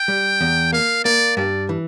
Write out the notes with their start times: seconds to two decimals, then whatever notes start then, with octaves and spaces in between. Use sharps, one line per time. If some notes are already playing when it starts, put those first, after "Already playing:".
Already playing: G5
0.08 G3
0.41 E2
0.72 A#3 F5
1.05 A#3 D5
1.37 G2 D5
1.69 E3